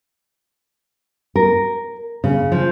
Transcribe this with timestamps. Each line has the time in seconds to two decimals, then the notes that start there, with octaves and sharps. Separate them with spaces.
1.36 A#4
2.24 C#3
2.52 F3